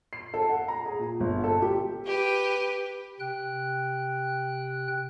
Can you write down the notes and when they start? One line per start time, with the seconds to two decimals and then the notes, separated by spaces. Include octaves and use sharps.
0.13 C7
0.34 A4
0.49 F#5
0.68 A#5
0.86 G#4
0.99 A#2
1.20 G1
1.44 A4
1.62 G4
2.06 G4 B4
3.20 C3 G5 F#6